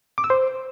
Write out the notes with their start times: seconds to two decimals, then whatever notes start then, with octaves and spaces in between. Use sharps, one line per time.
0.18 D6
0.24 E6
0.30 C5